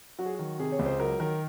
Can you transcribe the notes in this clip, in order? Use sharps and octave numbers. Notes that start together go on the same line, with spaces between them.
F#3 F#4
G#4
D#3 F#4
C3 G#4
C#5
C#2
C5
F#3 A#4
D#3 A#4